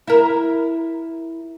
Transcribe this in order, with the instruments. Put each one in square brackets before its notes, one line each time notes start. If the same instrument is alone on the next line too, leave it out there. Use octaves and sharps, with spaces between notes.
[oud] E4 A#4